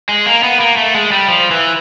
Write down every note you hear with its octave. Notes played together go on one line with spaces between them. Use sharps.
G#3
A#3
B3
A#3
A3
G#3
G3
F3
E3